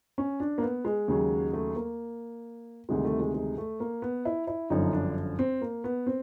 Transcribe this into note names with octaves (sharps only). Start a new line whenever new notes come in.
C#4
D4
A#3
B3
G#3
D#2 C#3 F#3
A3
A#3
D2 C3 D#3 G3 G#3
A3
G#3
G#3
A3
A#3
B3
E4
E4
G1 F#2 D3 F3 D#4
D4
C4
A#3
B3
C4